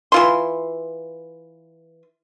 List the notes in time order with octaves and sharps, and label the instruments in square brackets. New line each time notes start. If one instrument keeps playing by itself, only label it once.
[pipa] E3 F4 C6